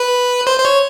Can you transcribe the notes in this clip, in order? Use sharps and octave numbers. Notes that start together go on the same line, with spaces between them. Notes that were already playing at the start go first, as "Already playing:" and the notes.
Already playing: B4
C5
C5
C#5